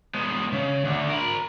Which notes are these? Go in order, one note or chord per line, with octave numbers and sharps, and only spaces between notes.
G#3 B3
C#3
D2 D3
A#4 B5